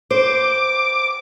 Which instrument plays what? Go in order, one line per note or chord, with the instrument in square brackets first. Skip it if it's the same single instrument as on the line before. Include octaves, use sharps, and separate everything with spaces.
[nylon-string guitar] C5 [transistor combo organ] D6